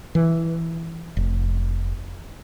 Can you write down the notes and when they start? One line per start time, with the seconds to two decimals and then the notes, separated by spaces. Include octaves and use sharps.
0.15 E3
1.17 F1